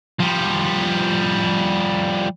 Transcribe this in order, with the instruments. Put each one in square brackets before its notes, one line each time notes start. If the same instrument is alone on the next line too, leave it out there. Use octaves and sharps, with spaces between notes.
[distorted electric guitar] F3 G3